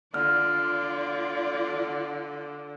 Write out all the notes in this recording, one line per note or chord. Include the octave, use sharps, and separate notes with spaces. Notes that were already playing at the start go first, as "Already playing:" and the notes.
D3 F4 D5 F6